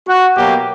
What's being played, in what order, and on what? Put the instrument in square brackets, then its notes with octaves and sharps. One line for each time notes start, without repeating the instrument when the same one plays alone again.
[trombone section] F#4
B2 F#3 A#3 G4